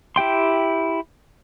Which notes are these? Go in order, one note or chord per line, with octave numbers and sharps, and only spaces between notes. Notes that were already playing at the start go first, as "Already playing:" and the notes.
E4 G4 G5 C6